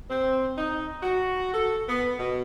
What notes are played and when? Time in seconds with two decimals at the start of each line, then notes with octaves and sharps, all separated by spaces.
0.10 C4
0.58 D#4
1.03 F#4
1.53 A4
1.89 B3
2.18 B2